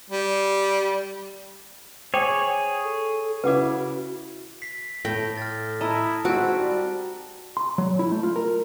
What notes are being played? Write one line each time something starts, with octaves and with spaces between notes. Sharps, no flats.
G3
G#4 C5 C#5 G5 D6
A4
C#3 E4 F#4 B4 F#5 D6
B6 C7
A2 G5 A#6
F6 A6
E4 D#5 A5 A#5
G#2 C4 F#4 D7
G3
C6
F#3
E4
A3
F4
A#4